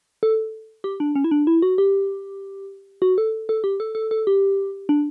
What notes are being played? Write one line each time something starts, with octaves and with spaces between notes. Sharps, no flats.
A4
G4
D4
C#4
E4
D4
E4
F#4
G4
F#4
A4
A4
G4
A4
A4
A4
G4
D4